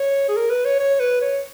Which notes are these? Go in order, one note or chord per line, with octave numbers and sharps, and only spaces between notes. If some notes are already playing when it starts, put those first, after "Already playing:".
Already playing: C#5
G#4
A#4
B4
C#5
C#5
B4
C#5